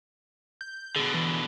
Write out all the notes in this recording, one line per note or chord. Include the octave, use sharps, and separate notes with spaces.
G6
B2 D3 G#4
E3